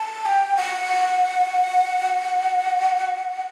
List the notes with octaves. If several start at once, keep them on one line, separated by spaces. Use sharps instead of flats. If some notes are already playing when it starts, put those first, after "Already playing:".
Already playing: A5
G5
F#5